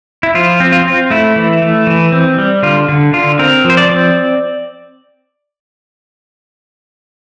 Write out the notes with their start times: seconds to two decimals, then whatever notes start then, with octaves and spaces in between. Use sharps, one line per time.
0.23 E4
0.35 F3 F4
0.60 C4
0.72 F4
0.85 C4
1.10 A3 E4
1.36 E3
1.62 A3
1.87 E3
2.12 C4
2.38 G3
2.63 D3 F4
2.88 D3
3.13 D3 F4
3.39 C4 A#4
3.65 F3
3.70 C5
3.77 D5
3.89 C4